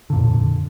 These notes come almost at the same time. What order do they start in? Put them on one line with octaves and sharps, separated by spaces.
D3 A#2 F2